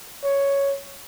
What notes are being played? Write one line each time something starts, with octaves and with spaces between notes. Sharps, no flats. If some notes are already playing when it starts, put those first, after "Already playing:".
C#5